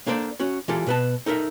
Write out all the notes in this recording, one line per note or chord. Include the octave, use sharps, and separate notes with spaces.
A#3 D4 A4 C5 D5
C#4 F#4 C#5
E3 G#3 F4 G4 A4
B2 B4 A5
D#4 A4 A#4 E5